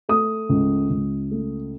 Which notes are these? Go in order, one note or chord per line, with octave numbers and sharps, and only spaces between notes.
A3 D#6
C#2
C#2
A3